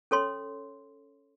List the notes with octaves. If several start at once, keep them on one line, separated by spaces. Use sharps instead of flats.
C#4 A4 C#5 C6